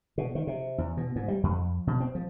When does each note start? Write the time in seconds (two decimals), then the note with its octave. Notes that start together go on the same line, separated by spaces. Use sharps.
0.18 B2
0.35 D#3
0.47 C3
0.78 E2
0.97 B2
1.16 G#2
1.28 G3
1.43 F2
1.87 B2
2.00 C4
2.15 F3